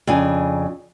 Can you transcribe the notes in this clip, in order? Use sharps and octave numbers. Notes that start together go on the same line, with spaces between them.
F2 C#3 D4 G#5